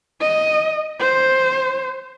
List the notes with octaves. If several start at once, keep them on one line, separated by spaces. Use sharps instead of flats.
D#5
C5